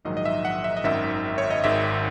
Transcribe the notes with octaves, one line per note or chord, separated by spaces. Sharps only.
A#1 G#2 D#3 F#3 D#5
D#5
E5
F#5
E5
D#5
G#1 F#2 D#3 E5
C#5
D#5
G#1 G#2 D#3 E5